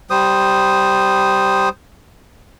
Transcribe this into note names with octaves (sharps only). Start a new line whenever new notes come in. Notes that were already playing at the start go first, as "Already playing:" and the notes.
G3 C5 D#6